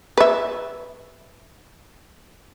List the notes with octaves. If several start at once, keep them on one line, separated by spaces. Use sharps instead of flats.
B4 E5